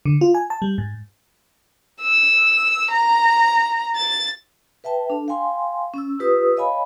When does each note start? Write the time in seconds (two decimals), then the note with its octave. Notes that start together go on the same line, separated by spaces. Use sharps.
0.05 D3
0.21 F4
0.34 G#5
0.50 A5
0.62 G3
0.78 G#2
2.01 E6
2.90 A#5
3.96 A6
4.84 B4 E5 G5 A5
5.10 D4 A4
5.28 F5 G5 G#5 C6
5.94 C#4 E6
6.19 F4 G4 B4 D#6 E6
6.57 C#5 D#5 F5 G#5 B5